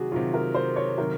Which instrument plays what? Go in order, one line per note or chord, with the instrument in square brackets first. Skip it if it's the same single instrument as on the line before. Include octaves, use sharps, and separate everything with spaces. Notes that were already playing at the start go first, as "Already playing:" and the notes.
Already playing: [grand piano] C3 D#3 F#3 [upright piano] F#4 G#4
[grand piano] C3 D#3 F#3 [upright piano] F4
[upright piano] A#4
C5
C#5
[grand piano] C3 D#3 F#3 [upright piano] A#4